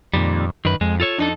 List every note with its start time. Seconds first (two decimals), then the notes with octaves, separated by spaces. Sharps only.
0.14 F2 A#2 D#3 G3
0.65 F#2 D#3 B4
0.81 F2 G#3
1.00 F4 A4 C#5
1.18 F2 D4 D#4 A4